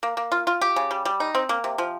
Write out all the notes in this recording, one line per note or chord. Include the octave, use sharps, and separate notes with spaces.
A#3
A#3
F4
F4
G4
C#3
G3
G3
D#4
C4
A#3
C3
F3